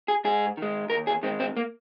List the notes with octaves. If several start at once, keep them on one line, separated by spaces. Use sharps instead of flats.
G#4
G#2 G#4
D#3 G#3
D#2 A#4
G#4
D#3 G#3 C4
C4
A#3